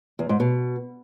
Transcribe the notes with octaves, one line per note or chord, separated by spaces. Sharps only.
E2
G#2
B2